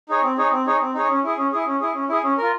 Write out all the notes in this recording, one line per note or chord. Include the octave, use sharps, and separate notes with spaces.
D#4 G#4 C#5
C4
D#4 G#4 C#5
C4
D#4 G#4 C#5
C4
D#4 G#4 C#5
C#4
E4 G#4
C#4
E4 G#4
C#4
E4 G#4
C#4
E4 G#4
C#4
F4 A#4